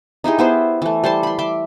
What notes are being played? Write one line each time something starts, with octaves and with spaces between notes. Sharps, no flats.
D#4 E4 G4 G#4
B3 E4 C5
E3 A3
G3 C5 A5 C6
B5 C6
E5 C6 D6